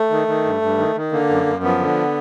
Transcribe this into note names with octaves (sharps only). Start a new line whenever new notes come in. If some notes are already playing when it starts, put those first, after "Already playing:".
Already playing: A3
D#3
D#3
G2
G2
D#3
D#3
D3 A#3
F#2
F#2
F3 B3
D3